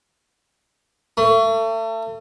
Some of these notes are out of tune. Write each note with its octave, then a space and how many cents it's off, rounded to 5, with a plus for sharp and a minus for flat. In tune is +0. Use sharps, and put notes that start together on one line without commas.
A3 +35